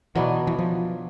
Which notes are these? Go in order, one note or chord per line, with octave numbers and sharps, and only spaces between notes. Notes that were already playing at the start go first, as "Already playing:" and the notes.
B2 E3 F#3 B3 D4
E3
F3